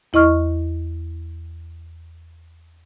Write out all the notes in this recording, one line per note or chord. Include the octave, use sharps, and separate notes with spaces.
E2 E4 D#5 C#6 F6